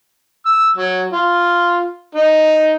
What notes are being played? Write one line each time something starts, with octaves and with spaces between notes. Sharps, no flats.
E6
F#3
F4
D#4